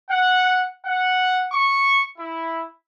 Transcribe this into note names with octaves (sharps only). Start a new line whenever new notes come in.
F#5
F#5
C#6
E4